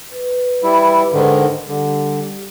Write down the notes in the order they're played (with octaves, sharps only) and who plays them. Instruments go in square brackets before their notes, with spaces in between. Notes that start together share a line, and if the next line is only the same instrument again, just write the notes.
[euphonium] B4
[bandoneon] G3 E4
G#2 D3 D#3
[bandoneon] D3 [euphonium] G3